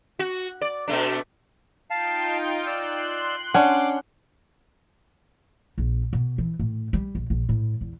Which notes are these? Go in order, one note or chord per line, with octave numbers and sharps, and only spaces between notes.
F#4
D5
B2 A3 D4
D#4 F4 F5 G5 A5
D5 C6 E6 F#6
C#4 D4 F#5 D6
A#1
B2
E3
A2
G3
A#1
A#1
A2
E2